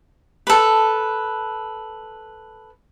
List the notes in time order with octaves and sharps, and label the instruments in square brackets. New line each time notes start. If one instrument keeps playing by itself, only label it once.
[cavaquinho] A4 B4